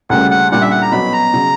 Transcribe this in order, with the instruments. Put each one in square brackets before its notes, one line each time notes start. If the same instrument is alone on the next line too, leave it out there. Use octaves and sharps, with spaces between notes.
[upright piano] D2 C#3 G3 A#3 [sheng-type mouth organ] F#5
[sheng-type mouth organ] F#5
[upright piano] A#2 G3 A#3 D4 [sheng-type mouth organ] F#5
[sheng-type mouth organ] E5
F#5
A#5
[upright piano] B2 F#3 B3 [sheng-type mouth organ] B5
[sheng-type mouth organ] A#5
[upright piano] C#3 F#3